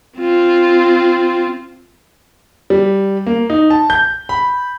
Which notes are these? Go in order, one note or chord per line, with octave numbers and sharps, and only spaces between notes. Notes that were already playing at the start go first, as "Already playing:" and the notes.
C4 F4
G3
A#3
D#4
A5
G6
B5